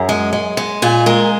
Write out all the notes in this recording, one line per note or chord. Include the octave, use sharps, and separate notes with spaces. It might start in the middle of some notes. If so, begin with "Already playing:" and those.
Already playing: F#2 G#4
G#3
G#3
G#3
A#2 G#4
G#3 A#4